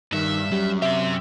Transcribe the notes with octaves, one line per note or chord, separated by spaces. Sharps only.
G2 D#3 E5
F#2 G3
C3 G4 E5 C6